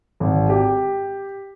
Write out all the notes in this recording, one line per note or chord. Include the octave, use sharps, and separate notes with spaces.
G#1
G4